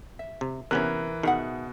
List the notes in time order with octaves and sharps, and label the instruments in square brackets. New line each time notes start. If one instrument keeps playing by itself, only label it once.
[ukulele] E5
[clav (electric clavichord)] C3
[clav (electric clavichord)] C3 B3 C#4 [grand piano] E3 A#4 F#6
[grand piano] B2 [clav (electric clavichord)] D#3 [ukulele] G#4 E5 F#5